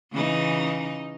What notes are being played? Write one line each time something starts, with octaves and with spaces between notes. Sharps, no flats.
C#3 E3 D#4